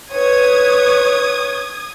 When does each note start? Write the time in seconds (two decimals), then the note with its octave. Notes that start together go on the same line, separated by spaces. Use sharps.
0.12 B4 C#5 D#6 G#6